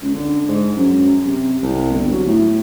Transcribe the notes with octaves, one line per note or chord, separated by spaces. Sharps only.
C#2
D3
G#2
F#2
C3
C2
G1
F#3
A2